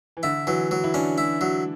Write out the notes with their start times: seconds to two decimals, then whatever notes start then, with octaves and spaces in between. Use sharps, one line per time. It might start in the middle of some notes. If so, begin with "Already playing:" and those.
0.17 E3
0.23 D3 E4
0.47 E3 F#3
0.71 E3 F#3
0.84 E4
0.94 C#4 D4
1.18 E4
1.41 F#3